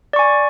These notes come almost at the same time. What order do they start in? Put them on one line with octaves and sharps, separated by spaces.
D5 C#6 G#5